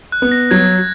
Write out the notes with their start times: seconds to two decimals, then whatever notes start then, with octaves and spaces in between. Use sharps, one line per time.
0.12 F#6
0.22 B3
0.32 A#6
0.51 F#3 G#6